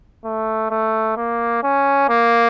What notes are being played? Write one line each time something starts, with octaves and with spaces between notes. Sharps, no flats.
A3
A3
A#3
C#4
A#3